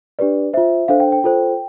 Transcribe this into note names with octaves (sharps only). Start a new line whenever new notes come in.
D4 G4 B4 D5
F4 C5 E5
D4 A4 C5 F5
G5
G5
F4 A4 C5